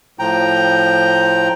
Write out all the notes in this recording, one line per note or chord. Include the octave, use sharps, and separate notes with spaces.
A2 F3 G5 A#5